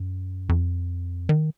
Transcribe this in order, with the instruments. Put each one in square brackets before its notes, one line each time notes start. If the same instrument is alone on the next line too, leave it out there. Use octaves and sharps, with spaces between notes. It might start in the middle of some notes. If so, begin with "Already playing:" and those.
Already playing: [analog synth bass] F#2
F2
D#3